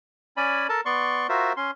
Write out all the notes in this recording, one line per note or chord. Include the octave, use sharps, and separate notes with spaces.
C#4 D5 G#5 B5
A4 A#4 A5
B3 D5 C6 C#6
F4 F#4 A#4 C5 E5
C#4 C6